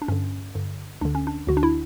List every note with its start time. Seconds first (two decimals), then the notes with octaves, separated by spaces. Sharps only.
0.02 D4
0.08 G2 D3 C#4
0.55 G2 D3
1.01 D2 D3 D4
1.15 C#4
1.27 D4
1.47 D2 D3 F#4
1.57 D4
1.63 E4